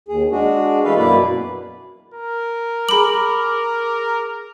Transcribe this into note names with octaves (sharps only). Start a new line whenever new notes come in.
D#2 G#4
G#3 D4 F#4 G#4
E3 G#3 A3 A4 B4 F5
F#2 B2 A#3 E4 B4 D5
A#4
G#4 A#5 B5 D6 F#7